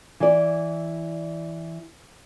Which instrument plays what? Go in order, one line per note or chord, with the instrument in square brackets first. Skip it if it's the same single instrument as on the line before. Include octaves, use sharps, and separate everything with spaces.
[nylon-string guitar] E3 D5